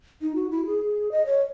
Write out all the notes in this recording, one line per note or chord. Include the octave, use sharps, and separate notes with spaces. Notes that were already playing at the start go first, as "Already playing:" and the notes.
D#4
F#4
E4
G#4
D#5
C#5